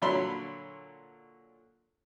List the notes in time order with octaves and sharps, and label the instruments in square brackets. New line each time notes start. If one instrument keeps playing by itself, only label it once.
[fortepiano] A#2 D3 F#3 C#5 B5 C6